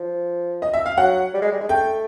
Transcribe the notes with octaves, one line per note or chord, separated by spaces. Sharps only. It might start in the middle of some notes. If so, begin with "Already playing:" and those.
Already playing: F3
D#5
E5
F5
F#3 F#5
G3
G#3
G3
G#3
A3 G5